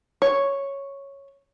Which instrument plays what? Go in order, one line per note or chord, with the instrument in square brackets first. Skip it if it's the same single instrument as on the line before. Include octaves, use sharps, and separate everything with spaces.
[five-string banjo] C#5